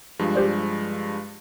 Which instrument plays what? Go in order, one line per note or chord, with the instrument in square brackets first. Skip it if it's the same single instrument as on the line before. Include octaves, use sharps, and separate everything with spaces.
[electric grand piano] G2 F3 G#3
[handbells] G4 C5 D5